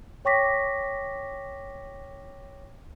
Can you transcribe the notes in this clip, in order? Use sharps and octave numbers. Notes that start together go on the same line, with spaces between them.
C#5 G5 C#6 D6 A#6 B6